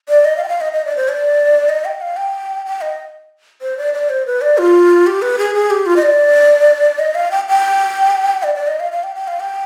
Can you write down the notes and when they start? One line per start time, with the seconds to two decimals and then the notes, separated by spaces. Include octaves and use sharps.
0.09 D5
0.25 D#5
0.37 F5
0.44 G5
0.48 F5
0.61 D#5
0.73 D#5
0.85 D5
0.97 C5
1.09 D5
1.69 D#5
1.85 G5
2.01 F5
2.17 G5
2.66 G5
2.81 D#5
3.62 C5
3.78 D5
3.94 D5
4.09 C5
4.26 B4
4.41 D5
4.58 F4
5.07 G4
5.22 B4
5.39 G#4
5.55 G#4
5.70 G4
5.86 F4
5.96 D#5
6.02 D5
6.99 D#5
7.15 F5
7.31 G5
7.49 G5
8.43 D5
8.55 D5
8.67 D#5
8.80 F5
8.92 F5
9.03 G5
9.16 G5
9.28 F5
9.40 G5